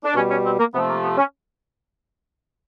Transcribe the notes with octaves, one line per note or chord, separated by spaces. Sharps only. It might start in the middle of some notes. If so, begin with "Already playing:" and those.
D4
B2 G3 C#4
C#4
C4
A#3
C3 F3 A3 B3
A#3
B3
C#4